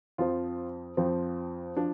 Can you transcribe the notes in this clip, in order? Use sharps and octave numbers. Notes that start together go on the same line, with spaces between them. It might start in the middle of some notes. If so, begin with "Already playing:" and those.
F2 F3 C4 F4
F2 F3 C4
F3 D4